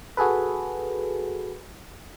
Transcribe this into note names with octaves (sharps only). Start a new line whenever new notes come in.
F#4 G#4 A4 B4